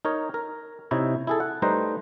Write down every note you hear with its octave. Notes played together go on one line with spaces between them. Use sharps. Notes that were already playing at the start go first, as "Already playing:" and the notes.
D#4 A#4 C#5
A#4
C3 D#4 E4 C#5
E4 G#4 A4
F#5
G3 A3 D#4 B4 C5 A#5